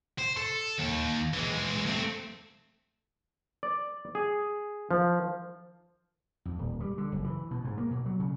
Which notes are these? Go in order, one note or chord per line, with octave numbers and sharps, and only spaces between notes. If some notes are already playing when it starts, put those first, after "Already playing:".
C5
A4
D#2
E3 G#3
A3 C4
D5
G#4
F3
F2
D#1
G3
D3
F#1
E3
B2
G#2
A#3
B2
F#3
C#3